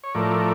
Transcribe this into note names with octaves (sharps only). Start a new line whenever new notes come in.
C#5
A2 F3 A3 A#4 D5